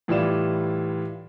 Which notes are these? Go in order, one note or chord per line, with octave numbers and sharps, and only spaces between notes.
A2 E3 G3 F4 D5 E7